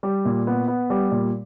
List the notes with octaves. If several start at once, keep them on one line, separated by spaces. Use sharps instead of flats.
G3
A#2
B3
B3
G3
A#2